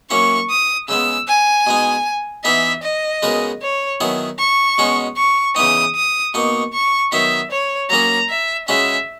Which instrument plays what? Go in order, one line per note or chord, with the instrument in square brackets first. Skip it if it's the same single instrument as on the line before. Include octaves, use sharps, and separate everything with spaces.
[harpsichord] F#3 A#3 C#4 E4 [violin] C#6
[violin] D#6
[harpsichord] C#3 G#3 B3 [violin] E6
[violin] G#5
[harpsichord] B2 G#3 D#4
[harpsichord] E3 B3 D#4 G#4 [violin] E5
[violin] D#5
[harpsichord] C#3 G#3 B3 F#4 A#4
[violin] C#5
[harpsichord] D#3 F#3 B3 E4 G#4
[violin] C#6
[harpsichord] B2 G#3 C#4 F#4
[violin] C#6
[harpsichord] C#3 E3 B3 D#4 [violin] D#6
[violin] D#6
[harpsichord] B2 A#3 D#4 [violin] C#6
[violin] C#6
[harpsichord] D#3 F#3 B3 D#4 [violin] E5
[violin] C#5
[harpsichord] F#3 A#3 C#4 G#4 [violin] A#5
[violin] E5
[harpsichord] C#3 G#3 C#4 F#4 [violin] E5